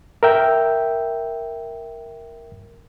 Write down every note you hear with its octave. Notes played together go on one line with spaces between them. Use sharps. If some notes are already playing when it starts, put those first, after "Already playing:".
A#4 E5 G5